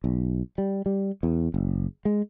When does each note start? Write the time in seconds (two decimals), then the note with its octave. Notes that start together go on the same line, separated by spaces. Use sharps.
0.04 B1
0.58 G3
0.86 G3
1.23 E2
1.54 F#1
2.05 G#3